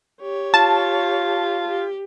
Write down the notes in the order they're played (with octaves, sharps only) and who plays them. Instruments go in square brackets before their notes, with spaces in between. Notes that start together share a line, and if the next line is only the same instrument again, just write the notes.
[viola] G4 C#5
[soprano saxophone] F4 [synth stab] A5
[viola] G4